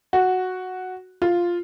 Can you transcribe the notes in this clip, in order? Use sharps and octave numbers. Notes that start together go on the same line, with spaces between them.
F#4
F4